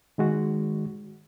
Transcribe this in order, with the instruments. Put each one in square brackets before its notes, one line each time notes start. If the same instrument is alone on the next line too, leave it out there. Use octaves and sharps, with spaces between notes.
[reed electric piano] D#3 G#3 F#4